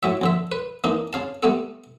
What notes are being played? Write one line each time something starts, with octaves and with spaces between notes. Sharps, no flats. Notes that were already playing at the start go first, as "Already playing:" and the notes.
A2 F#3 E5
A#1 D3 E5
B4
E3 A#3 D4 D#4
C#3 F5 A5
G3 A3 B3 A4